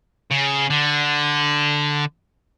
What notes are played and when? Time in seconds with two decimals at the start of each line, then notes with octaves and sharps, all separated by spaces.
0.31 C#3
0.70 D3